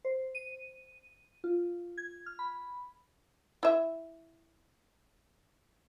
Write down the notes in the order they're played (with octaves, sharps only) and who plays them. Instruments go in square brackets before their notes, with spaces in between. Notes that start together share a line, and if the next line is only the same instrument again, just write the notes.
[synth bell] C5
D#7
F4
G#6
F6
B5
[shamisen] E4 E5